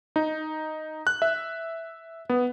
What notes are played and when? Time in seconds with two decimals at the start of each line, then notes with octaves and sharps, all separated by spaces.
0.16 D#4
1.07 F#6
1.22 E5
2.30 B3